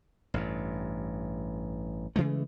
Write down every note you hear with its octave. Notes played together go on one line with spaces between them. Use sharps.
A1 G2
C#3 E3 G#3 A3